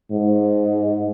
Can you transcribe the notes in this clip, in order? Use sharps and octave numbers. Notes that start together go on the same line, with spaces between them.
G#2